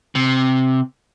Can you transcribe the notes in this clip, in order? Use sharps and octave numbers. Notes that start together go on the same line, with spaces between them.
C3